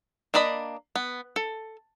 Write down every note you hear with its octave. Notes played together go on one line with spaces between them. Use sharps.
A#3 D4 D5 D#5 B5
B3
A4